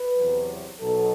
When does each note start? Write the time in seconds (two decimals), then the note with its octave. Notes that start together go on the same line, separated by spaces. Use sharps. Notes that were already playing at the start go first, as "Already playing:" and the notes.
Already playing: B4
0.16 E2 C3 F#3
0.80 B1 B2 F#3 A4